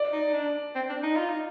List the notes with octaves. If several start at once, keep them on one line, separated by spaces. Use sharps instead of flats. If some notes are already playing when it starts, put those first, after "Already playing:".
Already playing: D5
D#4
D#4
D4
C4
D4
D#4
F4
D#4